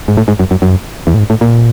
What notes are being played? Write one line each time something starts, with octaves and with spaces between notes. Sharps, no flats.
G#2
A2
G#2
F#2
F#2
F#2
E2
A2
G#2
A2
A#2